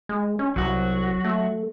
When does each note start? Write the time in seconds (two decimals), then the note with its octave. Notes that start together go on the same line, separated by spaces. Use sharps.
0.09 G#3
0.39 C#4
0.56 C2 F#3 F#4
1.24 A3